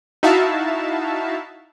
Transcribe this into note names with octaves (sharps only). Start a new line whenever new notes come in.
D#4 E4 F#4 E5 F5 A5